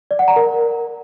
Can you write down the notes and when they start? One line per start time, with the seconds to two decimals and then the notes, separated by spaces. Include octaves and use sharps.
0.11 D5
0.19 F#5
0.28 A#5
0.36 A#4